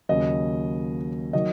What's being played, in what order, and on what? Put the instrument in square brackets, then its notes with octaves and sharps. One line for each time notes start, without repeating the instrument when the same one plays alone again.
[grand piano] D#2 C#3 F#3 D#5
D#3 F#3 D#5